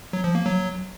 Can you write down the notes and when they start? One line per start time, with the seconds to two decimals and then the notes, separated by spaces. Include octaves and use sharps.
0.13 F#3
0.24 F3
0.35 A#3
0.46 F#3